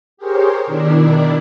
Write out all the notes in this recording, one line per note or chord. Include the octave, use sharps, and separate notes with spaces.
G4 G#4 A#4 C5 C#5
B2 D#3 D4 E4 A#4 D5